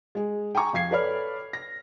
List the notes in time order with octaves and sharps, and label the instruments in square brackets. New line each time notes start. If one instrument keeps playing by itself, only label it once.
[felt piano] G#3 G#4
G5 G#5 A#5 C#6
F2 F5 G#6 C7
A4 B4 C#5 D5 B5 F6
A#6